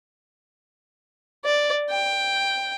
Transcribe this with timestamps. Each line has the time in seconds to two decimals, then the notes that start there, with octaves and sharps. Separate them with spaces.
1.45 D5
1.90 G5